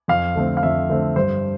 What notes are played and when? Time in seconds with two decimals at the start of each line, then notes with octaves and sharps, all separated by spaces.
0.08 F2 F5
0.36 D3 A3 C4
0.57 F5
0.63 F2 E5
0.89 D3 A3 C4
1.16 G2 C5